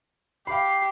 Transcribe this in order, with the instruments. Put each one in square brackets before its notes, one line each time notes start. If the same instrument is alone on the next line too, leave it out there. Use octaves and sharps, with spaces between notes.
[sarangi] G4 [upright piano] F5 B5 [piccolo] C7